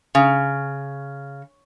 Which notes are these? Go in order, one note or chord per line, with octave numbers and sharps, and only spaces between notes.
C#3